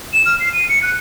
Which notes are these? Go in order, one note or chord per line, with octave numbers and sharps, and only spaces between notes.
E7
F6
C7
D#7
C#7
F#6